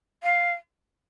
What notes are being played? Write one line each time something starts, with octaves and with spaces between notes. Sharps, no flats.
F5